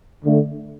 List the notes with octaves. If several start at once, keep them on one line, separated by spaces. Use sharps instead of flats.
D3 A3